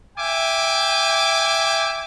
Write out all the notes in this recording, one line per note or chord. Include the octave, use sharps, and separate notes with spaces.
E5 G5 G#5 D6